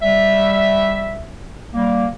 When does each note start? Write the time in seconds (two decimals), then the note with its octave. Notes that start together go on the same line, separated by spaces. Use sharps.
0.03 G3 E5
1.74 G3 A#3